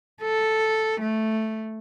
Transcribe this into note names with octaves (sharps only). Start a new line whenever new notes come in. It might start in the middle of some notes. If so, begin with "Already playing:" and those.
A4
A3